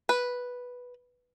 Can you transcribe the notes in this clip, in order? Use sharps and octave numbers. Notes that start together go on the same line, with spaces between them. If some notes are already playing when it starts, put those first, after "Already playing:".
B4